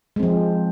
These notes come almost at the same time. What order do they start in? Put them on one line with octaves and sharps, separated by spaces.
G#3 C4 F3